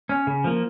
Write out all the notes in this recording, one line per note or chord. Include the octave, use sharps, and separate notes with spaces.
C#4
C#3
F3 A#3